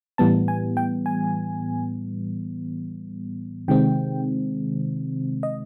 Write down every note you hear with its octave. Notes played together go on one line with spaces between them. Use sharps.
A2 E3 G3 B3 A5
G#5
G5
G#5
C3 D#3 G#3 C4 G5
D#5